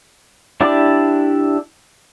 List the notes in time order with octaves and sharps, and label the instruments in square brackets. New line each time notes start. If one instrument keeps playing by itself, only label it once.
[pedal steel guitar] D4 E4 G4 D5 D6